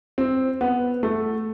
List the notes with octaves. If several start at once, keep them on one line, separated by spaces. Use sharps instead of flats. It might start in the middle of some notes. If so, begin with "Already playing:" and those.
C4
B3
A3